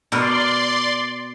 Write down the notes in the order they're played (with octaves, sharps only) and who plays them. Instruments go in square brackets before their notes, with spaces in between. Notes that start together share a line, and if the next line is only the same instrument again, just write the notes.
[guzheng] B2 B3 A#4 [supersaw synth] D5 C6